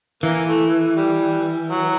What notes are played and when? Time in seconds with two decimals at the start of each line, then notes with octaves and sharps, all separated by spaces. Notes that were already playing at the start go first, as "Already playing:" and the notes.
0.23 E3 A#3
0.48 A3
0.98 G3
1.72 F#3